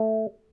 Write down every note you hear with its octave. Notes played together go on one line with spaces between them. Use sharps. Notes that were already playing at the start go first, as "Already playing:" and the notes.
Already playing: A3